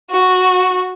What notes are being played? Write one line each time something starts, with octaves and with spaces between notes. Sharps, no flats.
F#4